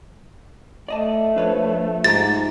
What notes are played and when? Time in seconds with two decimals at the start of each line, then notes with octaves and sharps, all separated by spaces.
0.88 A3 D5 D#5 A5
1.36 F3 D4 B4 C#5
2.04 G#2 F4 G4 A#5 A6